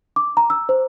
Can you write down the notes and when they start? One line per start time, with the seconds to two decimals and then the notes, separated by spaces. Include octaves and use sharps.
0.16 D6
0.37 A#5
0.50 E6
0.69 C5